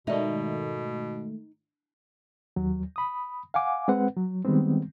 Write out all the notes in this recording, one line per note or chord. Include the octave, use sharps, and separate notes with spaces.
G#2 B2 D#3 A3 D#4 D5 E5
D#2 F#3
B5 D#6
F5 F#5 G#5 D6
G#3 C4 B4 F#5
F#3
D#3 G3 G#3 B3 C4